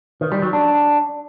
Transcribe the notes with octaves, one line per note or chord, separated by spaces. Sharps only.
D#3
G3
F#3
D4